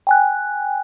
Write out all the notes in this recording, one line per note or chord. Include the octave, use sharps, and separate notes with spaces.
G5 G#5 F#6